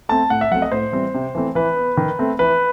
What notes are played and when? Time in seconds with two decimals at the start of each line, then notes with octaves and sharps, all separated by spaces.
0.09 A3 C4 A5
0.30 A2 F#5
0.41 E5
0.51 F#3 A3 C4 F#5
0.62 D#5
0.72 A2 C5
0.92 E3 G3 C4
1.14 C3
1.35 E3 A3 C4
1.55 E3 B4
1.76 B3
1.97 D#3
2.19 A3 C4
2.39 E3 B4